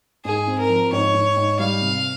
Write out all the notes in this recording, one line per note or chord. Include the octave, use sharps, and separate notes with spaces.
G#2 G#4
C4
A#4
F3
G#2 C#5
G#2
G#2
G3 F5
C3